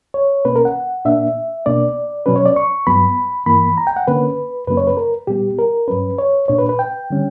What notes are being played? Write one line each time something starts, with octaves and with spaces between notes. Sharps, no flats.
C#5
B2 A#3 C#4 B4
A#4
F#5
A#2 A#3 D4 E5
B2 A#3 D4 D5
B2 F#3 C#4 B4
C#5
D5
C#6
G2 F#3 B3 B5
G2 E3 A#3 B5
A#5
G5
F#5
D3 A#3 C#4 B4
F#2 C#3 F#3 A#3 C#4 B4
C#5
B4
A#4
A#2 G3 B3 G4
A#4
G2 F#3 C#4 B4
C#5
A#2 A#3 D4 C#5
B4
B4
G5
D3 G3 C#4